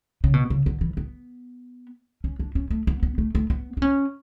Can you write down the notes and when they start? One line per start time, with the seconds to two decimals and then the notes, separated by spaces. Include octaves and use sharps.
0.24 C#3
0.34 B2
0.50 C#3
0.66 D3
0.81 E3
0.97 B3
2.24 C#4
2.39 D4
2.55 C#4
2.70 A3
2.87 B3
3.03 B3
3.18 A3
3.35 A3
3.50 B3
3.77 D4
3.82 C#4